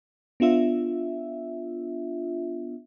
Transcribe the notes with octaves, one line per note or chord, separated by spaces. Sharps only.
B3 D4 F4 E5